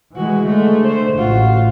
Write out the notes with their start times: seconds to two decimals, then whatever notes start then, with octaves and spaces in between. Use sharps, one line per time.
0.16 E3 G#3 F#4
0.46 D3 G#3 A3
0.84 C5
1.18 A1 F4 F#4